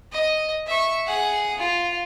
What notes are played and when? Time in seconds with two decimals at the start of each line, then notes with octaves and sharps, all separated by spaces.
0.12 D#5
0.67 E5 C#6
1.07 G#4 F#5
1.59 F4